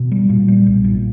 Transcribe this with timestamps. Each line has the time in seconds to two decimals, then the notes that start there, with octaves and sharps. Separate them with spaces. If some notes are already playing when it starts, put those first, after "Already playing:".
Already playing: B2
0.11 G3
0.29 A#2
0.48 G3
0.66 B1
0.84 A#2